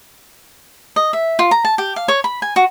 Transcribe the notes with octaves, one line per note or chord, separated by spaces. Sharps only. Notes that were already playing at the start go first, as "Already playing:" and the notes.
D#5
E5
F4
A#5
A5
G4
F5
C#5
B5
G#5
F#4